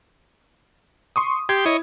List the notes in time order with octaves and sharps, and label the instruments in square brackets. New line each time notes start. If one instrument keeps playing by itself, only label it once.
[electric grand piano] C6 C#6 D#6
[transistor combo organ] G4 C6 [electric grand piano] G#6
[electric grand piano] E4 [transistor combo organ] C#5 D#5